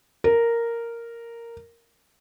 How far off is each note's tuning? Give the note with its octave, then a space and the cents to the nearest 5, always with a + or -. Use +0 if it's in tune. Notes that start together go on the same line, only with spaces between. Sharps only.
A#4 -5